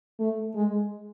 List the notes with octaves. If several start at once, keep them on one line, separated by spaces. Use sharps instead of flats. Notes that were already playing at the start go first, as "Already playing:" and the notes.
A3
G#3